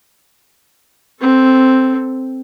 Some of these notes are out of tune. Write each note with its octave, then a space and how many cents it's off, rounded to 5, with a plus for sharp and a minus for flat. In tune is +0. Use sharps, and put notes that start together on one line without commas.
C4 +0 A4 +0